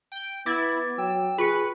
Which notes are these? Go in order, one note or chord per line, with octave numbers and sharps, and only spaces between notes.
G5
B3 E4 D6 G#6 A6
F#3 G5 E6
F4 G#4 B4 B5 C#6 C#7